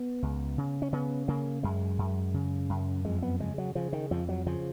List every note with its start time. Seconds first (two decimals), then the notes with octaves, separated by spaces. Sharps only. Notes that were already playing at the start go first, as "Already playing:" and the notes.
Already playing: B3
0.22 C#2
0.58 C#3
0.82 C#4
0.93 C#3 B3
1.28 C#3 A#3
1.63 F#2 G#3
1.99 F#2
2.34 C#3
2.69 F#2
3.05 F2 G#3
3.22 B3
3.40 C#3 G#3
3.58 F#3
3.75 C#3 F3
3.93 D#3
4.11 F2 F3
4.29 F#3
4.46 C#3 F3